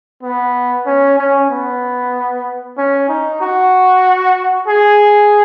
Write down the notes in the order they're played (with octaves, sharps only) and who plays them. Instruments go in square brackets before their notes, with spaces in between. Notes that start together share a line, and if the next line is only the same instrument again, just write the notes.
[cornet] B3
C#4
C#4
B3
C#4
D#4
F#4
G#4